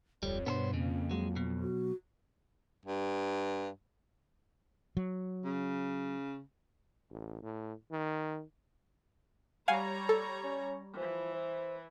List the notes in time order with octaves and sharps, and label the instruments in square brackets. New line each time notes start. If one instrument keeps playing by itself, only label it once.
[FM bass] D1 [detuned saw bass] F2 [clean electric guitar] G3 [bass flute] C#5
[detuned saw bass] G2 [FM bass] B2 [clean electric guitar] B3 A4 C5
[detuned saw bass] F2 [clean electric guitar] C#3 [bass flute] A#3
[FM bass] F#3 [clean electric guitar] G#3
[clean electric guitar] B2
[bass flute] F#4
[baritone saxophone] G2
[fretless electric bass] F#3
[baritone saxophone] C#3
[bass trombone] A1
A2
D#3
[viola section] G3 C#5 A#5 [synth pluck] F5 F#5 G#5
[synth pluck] A4
[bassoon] C#4
[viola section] E3 [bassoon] F3
[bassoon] C5